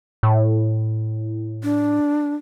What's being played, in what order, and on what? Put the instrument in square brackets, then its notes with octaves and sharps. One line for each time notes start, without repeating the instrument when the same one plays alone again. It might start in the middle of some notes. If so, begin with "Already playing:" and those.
[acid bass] A2
[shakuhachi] D4